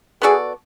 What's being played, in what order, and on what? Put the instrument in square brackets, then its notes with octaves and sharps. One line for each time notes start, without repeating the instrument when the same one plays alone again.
[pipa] B3 F#4 A4 D5 [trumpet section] G#4